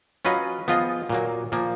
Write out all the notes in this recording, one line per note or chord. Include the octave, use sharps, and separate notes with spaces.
F#3 C#4 F4 B4 D#5
F3 B3 F4 G#4 D#5
A#2 F#3 A#3
A#2 F3 A#3